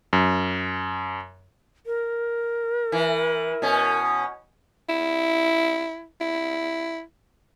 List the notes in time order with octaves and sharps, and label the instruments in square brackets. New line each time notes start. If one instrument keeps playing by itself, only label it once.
[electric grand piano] F#2
[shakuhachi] A#4
[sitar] E3
B2 C#4
[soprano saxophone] E4
E4